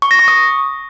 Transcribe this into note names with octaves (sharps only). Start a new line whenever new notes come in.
C#6
A#6
C#6
D#6